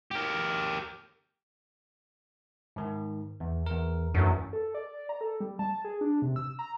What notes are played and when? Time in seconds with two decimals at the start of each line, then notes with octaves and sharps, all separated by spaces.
0.11 G4 A#4
2.76 G#2 D#3
3.40 E2
3.66 E2 A#4
4.14 F#2 E3 A3 D4
4.53 A4
4.75 D5
5.09 A#5
5.21 A4
5.40 G3
5.59 A5
5.85 G#4
6.01 D4
6.22 C3
6.36 E6
6.59 A#5